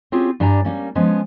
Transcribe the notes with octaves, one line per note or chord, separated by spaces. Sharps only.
C4 C#4 F4 G4 G#4
G2 D4 G4 G#5 A#5
G3 A#3 C#4
F3 G#3 B3 C#4